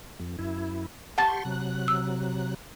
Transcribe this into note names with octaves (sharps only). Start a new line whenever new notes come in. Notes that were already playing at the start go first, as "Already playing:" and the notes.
F2
F#2 E4
G4 F#5 A5 C6 C#6 A6
C3 F#3 F#6
E6